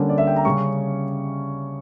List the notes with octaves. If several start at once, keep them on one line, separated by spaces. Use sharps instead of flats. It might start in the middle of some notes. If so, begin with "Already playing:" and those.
Already playing: D3 G3 A#3 C#4
D5
E5
G5
A#5
C#3 G3 C#4 C#6